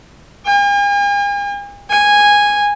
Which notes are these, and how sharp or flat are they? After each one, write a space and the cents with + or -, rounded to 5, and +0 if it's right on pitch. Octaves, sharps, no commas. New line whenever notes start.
G#5 -45
G#5 -10